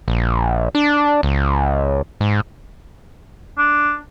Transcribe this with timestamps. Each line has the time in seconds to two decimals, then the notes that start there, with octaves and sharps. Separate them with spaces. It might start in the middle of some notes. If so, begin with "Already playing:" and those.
0.08 A#1
0.75 D4
1.23 C#2
2.21 G#2
3.58 D4